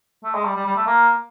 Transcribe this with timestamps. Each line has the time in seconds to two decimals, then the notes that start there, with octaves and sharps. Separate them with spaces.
0.24 A3
0.35 G#3
0.45 G3
0.55 G3
0.66 G3
0.77 A3
0.87 A#3